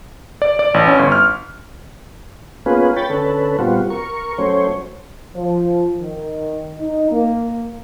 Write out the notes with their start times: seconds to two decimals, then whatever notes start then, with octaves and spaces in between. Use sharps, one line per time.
0.42 D5
0.59 D5
0.74 A1
0.87 C#4
0.99 G1
1.12 F6
2.66 A#3 B3 C#4 F4 G#4 B4
2.96 C#5 G5 B5 A6
3.10 D3 C#4 A4 B4
3.59 A#2 G3 B3 C4 F4 F#4
3.90 A#4 C#6
4.38 F#3 A3 C#4 C5 C#5
5.34 F3
6.00 D#3
6.78 D#4
7.11 A#3